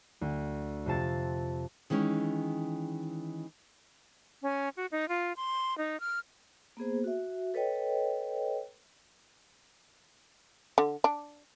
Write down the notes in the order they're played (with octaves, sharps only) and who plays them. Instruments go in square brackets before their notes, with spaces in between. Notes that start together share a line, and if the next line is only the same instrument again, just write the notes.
[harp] D2
F2 C3 F4 A5 A6
[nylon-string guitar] D#3 E3 G#3 C#4
[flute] C#4
F#4
D#4
F4
C6
D#4
F6
[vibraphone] A#3 B3 G#4 C5
F#4 E5
A4 B4 C#5 D#5 G5
[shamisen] D3
D4